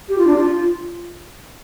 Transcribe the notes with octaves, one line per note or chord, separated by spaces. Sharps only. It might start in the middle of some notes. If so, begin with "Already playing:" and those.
G4
F4
D4
F4